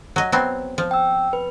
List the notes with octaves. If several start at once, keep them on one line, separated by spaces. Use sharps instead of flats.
F#3 D#5
F#3 B3 C4
F3
G5 E6
B4